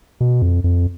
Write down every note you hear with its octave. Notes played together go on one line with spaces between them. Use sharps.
B2
F2
F2